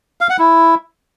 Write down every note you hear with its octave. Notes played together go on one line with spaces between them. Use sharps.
F5
F#5
E4